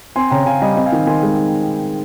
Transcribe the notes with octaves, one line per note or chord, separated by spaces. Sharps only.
C4 G#5 C6
C#3 G5 A#5
C#3 F5 G#5
G3 D#5 G5
C4 D#5 G5
F5 G#5
D#3
D#3 G#5 C6
G#3